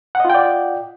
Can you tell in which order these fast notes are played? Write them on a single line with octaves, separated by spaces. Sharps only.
F#5 D#5 F4 G5 D5